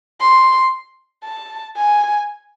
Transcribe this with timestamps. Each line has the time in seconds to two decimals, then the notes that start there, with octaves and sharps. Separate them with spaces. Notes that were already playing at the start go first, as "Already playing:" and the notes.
0.21 C6
1.24 A5
1.77 G#5